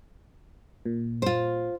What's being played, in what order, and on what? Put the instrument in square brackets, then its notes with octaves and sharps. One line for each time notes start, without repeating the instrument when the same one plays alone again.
[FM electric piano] A#2
[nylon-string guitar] F4 C5